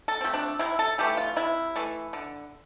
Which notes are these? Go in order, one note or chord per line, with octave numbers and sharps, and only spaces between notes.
A4
F3 A3 C4
D4
C3 E4
A4
E3 A3 G4
F4
C3 E4
E3 A3
D3